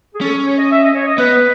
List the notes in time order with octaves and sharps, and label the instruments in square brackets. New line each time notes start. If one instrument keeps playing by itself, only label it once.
[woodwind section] G#4
[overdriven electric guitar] C#4 [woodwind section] A4
[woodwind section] C#5
D#5
E5
D#5
C#5
D#5
[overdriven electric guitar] B3 [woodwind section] B4